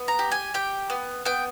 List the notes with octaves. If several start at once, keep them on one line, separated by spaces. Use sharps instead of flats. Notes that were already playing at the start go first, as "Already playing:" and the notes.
Already playing: B3
A#5
G4
G#5
G4 G5
B3
B3 G5